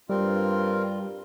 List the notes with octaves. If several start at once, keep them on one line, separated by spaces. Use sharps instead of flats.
G2 G3 C4 F4 A#4